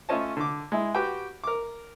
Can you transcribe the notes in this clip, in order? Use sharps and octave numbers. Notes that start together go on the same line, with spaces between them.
A3 C#4 F4 C#5 D#5 A5
D3 D6
G#3 E4
F#4 G4 B4 G5
A#4 D6